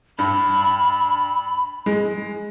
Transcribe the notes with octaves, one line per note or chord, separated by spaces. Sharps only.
G2 B5
G#3